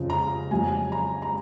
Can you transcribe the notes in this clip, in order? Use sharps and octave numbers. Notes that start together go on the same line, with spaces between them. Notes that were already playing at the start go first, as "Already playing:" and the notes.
Already playing: F2 C#3 F3
A#5
F2 C#3 F#3 G#5
A#5
A#5